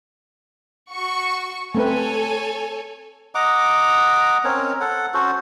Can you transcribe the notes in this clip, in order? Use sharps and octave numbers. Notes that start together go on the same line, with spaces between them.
F#4 C#6
A3 C4 A4 B4 C#5 G#5
D#5 F#5 A#5 D6
C4 C#4 A#4 C#5
A4 F#5
C#4 F#4 A4 C5